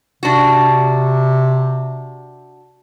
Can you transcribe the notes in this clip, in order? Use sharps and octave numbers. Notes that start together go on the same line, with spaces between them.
C3 D4 F#4